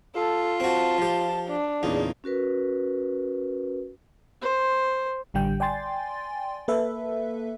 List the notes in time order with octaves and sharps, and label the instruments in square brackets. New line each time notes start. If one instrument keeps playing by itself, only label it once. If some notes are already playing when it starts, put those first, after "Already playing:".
[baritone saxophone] F4 [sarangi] A4
[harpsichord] C4 F#4 [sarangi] A5
[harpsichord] F3 G4
[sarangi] D4
[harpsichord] E2 A#2 D#4 [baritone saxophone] C#3
[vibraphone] C#4 F#4 A#4 B4
[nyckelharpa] C5
[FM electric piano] A1 D3 G3 G5
D5 G5 G#5 C6 A6
A#3 A4 B4 E5